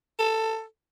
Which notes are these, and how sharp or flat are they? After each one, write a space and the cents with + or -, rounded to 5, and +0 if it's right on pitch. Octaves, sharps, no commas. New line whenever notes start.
A4 +15